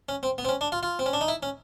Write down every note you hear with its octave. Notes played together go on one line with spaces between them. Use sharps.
C#4
C4
B3
C4
C#4
D4
F4
F4
C4
C#4
D4
D#4
E4
C#4